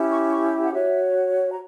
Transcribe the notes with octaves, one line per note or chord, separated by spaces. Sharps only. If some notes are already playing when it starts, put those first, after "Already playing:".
Already playing: C#4 E4 G4
C#6
C#6
F#5
F#4 C#5 E5
A#5